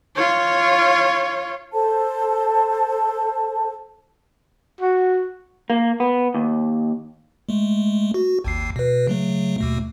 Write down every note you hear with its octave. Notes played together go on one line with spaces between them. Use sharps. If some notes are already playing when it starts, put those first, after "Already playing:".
F4 C#5
A4 C5 A5
F#4
A#3
B3
D#2
G#3 A3
F#4
G#1 D#2 C7
B2 B4
C#3 F#3 A3
D#2 B2 A3